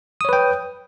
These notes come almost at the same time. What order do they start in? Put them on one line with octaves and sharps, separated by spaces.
D#6 C#5 B4 G5